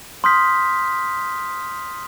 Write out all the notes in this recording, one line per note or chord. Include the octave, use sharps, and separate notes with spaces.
C6 D#6 F6 G6 B6